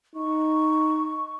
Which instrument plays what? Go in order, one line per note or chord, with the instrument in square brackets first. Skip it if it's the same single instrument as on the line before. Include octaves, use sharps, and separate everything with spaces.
[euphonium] D#4 [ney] C#6